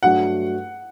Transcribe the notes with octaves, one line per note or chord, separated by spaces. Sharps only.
G2 F#3 A3 D4 F#4 F#5